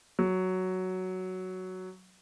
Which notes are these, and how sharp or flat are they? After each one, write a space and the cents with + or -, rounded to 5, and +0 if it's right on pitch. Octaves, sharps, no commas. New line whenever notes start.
F#3 +5